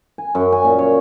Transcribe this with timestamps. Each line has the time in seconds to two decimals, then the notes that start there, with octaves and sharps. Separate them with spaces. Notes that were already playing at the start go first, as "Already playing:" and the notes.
0.18 G#5
0.35 F#2
0.52 G#5
0.65 A#2
0.79 C#5